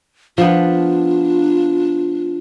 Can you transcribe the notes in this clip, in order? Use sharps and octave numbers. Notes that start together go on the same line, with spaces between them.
F3 B3 D4 F4